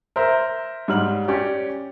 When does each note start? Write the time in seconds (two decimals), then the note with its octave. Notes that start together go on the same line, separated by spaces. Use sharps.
0.16 A#4 C5 E5
0.88 G#2 G3 F6 F#7
1.28 C#4 G4 D5